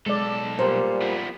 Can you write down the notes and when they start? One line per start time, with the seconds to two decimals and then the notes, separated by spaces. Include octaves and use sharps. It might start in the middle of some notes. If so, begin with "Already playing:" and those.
0.06 B1 G#3 A4 D5
0.59 A#2 G3 C5
1.02 F3 B3